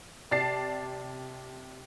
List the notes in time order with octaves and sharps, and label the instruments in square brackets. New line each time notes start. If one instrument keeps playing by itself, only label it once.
[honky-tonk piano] C3 D5 A5 A6 C7